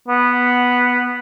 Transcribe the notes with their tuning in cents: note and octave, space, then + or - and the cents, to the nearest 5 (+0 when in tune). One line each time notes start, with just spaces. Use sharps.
B3 -5